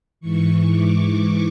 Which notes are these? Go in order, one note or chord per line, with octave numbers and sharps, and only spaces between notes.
G#2 E3 C#6
D6